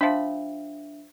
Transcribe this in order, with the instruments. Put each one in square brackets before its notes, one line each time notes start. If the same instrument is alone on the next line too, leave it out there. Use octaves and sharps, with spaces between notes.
[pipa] F3 B5 [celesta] D4 E5